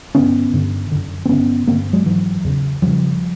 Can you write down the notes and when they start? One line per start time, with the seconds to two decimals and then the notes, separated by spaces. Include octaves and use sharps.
0.15 G2 D3 B3 C#4
0.53 G2 D3
0.91 F#2 D3
1.25 C4
1.29 G2 D3 B3 C#4
1.67 G2 D3 A#3 C4
1.93 F#3 G#3
2.06 G#2 E3 F#3
2.45 E2 C#3
2.82 E2 C#3 F3 G3